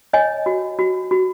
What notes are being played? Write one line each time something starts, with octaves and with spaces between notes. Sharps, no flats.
C#5 D#5 G#5
F#4
F#4
F#4